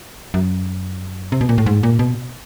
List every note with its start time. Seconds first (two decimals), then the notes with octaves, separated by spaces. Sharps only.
0.34 F#2
1.32 C3
1.41 B2
1.49 A#2
1.58 A2
1.66 G#2
1.83 A#2
1.99 B2